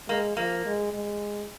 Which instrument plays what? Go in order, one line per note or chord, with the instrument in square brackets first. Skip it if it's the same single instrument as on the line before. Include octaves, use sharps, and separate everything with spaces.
[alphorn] G#3 [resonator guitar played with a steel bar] A#3
[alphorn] F3 [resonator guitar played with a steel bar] A#3
[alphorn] G#3
G#3